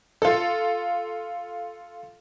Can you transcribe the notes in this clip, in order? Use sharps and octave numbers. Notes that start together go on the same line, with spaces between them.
F4 A4